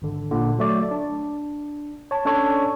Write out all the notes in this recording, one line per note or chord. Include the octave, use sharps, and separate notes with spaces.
G#1 D3
A#2 D3
F#3 A3 D5
D4
C#5 A5
C#4 D4 A4 C#5